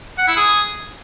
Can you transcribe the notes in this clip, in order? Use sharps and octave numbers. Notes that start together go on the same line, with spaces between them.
F#5
E4
G#4